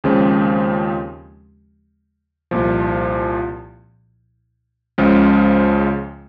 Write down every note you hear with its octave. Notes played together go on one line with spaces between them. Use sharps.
D#2 C#3 F3 G#3 C4
C2 A#2 F3
C#2 C#3 F3 G#3